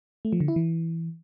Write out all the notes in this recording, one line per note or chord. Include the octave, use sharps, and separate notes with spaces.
A3
F3
D3
E4
E3